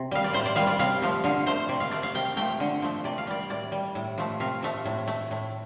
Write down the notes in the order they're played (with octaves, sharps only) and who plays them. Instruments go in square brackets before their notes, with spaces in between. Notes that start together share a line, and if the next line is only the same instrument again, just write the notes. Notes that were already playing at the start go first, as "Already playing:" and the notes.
Already playing: [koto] C3
G3 F5
D5
A2 C5
D5
G3 F5
D5
C3 F5
F3 A3
D3 F5
A3 C5
C3 D5
F5
A3 D5
F5
C3 G5
F5
F3 A3 G5
D3
F3 A3
C3 D5
F5
G3 D5
A2 D5
G3
A2
F3 A3
C3 F5
F3 A3
A2
A3
A2